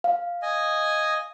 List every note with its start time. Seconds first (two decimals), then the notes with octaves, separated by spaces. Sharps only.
0.04 F5
0.42 D#5 G#5